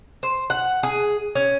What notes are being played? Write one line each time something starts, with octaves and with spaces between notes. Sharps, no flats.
C5
F#5
G#4
C#4